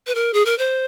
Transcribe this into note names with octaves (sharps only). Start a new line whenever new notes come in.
B4
A#4
G#4
A#4
C5